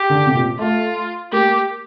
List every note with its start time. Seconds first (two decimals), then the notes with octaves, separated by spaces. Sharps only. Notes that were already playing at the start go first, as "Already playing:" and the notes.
Already playing: G4
0.10 D3
0.27 C3
0.34 A#2
0.59 A3 F4
1.32 A#3 G4